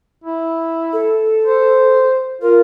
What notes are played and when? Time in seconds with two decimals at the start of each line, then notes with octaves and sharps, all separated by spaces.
0.24 E4
0.92 A4
1.46 C5
2.41 F4 A#4